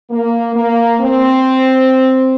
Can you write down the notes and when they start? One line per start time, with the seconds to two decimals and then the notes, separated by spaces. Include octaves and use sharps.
0.11 A#3
0.55 A#3
1.01 C4